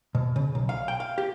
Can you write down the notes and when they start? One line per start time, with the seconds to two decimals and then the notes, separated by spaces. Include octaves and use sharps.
0.15 B2
0.36 C#3
0.55 B1
0.69 F5
0.88 G5
1.00 F5
1.18 G4